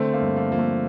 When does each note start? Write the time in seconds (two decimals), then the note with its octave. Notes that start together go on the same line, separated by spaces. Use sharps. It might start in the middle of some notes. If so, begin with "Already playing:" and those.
Already playing: D3 A3 C4
0.13 A#3
0.21 G2
0.36 A#3
0.51 F3 A#3
0.59 A3